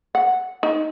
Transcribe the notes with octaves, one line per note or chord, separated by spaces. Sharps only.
F#5
D#4